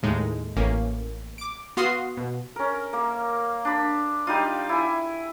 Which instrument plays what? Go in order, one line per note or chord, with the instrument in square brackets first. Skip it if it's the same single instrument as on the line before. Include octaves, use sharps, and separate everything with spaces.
[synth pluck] D#2 A2 G#3 D#4
A1 A#3 C#4
D6 D7
B3 F#4 F5 C6 D#6 C7
B2
[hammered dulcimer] C#4 A#4
A#3
D4 B5
G3 D#4 F4
E4 G#5